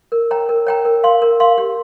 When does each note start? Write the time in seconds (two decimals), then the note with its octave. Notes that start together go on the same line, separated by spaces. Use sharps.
0.12 A#4
0.31 C#5 G5 A#5
0.49 A#4
0.67 C#5 G5 A#5
0.85 A#4
1.03 F5 C6
1.22 A#4
1.40 F5 C6
1.58 G4